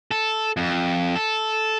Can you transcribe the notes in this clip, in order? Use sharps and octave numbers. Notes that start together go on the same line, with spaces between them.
A4
F2
A4